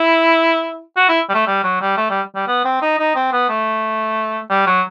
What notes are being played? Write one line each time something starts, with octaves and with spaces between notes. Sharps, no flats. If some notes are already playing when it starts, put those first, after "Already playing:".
Already playing: E4
F#4
E4
G3
A3
G3
F#3
G3
A3
G3
G3
B3
C4
D#4
D#4
C4
B3
A3
G3
F#3